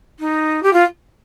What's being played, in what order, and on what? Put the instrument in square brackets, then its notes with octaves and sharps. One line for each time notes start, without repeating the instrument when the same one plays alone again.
[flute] D#4
G4
F4